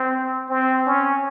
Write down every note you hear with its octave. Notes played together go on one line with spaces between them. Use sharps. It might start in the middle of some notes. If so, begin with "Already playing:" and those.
Already playing: C4
C4
C#4